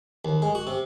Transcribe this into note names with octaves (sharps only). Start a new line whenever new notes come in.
D#2
G#3
F#4
C3